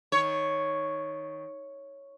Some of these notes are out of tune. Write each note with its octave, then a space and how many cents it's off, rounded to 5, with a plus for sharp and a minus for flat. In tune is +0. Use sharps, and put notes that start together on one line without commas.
D#3 +10 C#5 +0